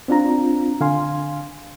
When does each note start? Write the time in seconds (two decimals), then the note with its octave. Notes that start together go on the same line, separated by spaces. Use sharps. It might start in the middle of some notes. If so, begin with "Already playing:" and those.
0.08 C4 D4 F4 A#5
0.81 D3 F5 G#5 C6